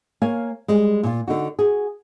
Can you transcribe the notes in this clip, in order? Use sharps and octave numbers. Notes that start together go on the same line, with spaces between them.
A#3 C#5 F5 G#5
G3 G#3
A#2 F4
D3 D#4 F#4
F#4 G#4